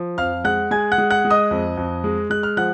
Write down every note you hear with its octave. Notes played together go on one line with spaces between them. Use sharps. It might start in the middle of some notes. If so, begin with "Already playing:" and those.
Already playing: F3
F2 F5 F6
G#3 F#5 F#6
G#3 G#5 G#6
F#5 F#6
G#3
F#5 F#6
G#3
D#5 D#6
F2
F2
G#3
G#3 F#6
F6
F3 F#5 F#6